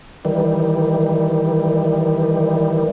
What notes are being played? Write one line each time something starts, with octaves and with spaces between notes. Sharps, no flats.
D#3 E3 G3